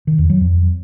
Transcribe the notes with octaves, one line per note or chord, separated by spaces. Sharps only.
D#3
E2
F#3
F2